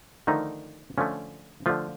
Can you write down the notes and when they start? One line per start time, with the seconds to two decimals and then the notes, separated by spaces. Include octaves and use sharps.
0.27 D3 D#3 F3 A3 D#4
0.98 D3 F3 A3 C#4
1.66 D3 F3 A3 F4